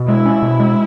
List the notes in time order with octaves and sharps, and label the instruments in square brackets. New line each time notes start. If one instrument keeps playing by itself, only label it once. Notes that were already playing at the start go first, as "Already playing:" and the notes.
Already playing: [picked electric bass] B2
[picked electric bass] G#3 [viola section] E4
[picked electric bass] C#4
B2
G#3